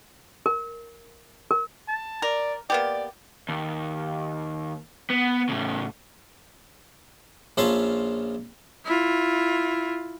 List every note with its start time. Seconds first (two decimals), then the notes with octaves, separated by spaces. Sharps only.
0.46 A#4
1.51 A#4
1.88 A5
2.22 A#4 D5
2.70 A#3 B3 G4 D5
3.49 D#2
5.10 B3
5.49 A2 C#3
7.57 A#1 C#4 F4 E5 F5 A5
8.85 E4 F4